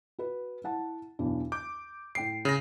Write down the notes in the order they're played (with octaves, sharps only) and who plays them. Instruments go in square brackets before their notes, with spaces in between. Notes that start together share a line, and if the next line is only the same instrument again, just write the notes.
[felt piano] F#4 B4
E4 F#5 A5
B1 E2 D4
[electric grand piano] D6 [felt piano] G6
[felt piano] A2 G5 D7 [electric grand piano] C7
[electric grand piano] C#3 A#6